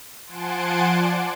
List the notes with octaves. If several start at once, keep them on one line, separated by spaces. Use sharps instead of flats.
F3 F#5 G#5 A5 C6 D7
D5